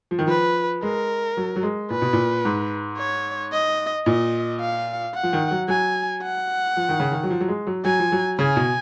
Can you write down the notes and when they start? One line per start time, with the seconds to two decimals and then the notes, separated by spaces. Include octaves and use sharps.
0.11 F3
0.19 D#3
0.27 F3 B4
0.83 G#3 A#4
1.37 F#3
1.56 F#3
1.63 G#3
1.90 A#2 B4
2.02 B2
2.13 A#2
2.45 G#2
2.98 C#5
3.52 D#5
4.06 A#2 D#5
4.61 F5
5.15 F#5
5.23 F3
5.33 D#3
5.51 F#3
5.68 F#3 G#5
6.23 F#5
6.77 F3
6.89 D#3
7.00 C#3
7.12 D#3
7.23 F#3
7.30 F3
7.41 F#3
7.48 G#3
7.67 F#3
7.85 F#3 G#5
7.99 F3
8.12 F#3
8.39 C#3 G#5
8.56 B2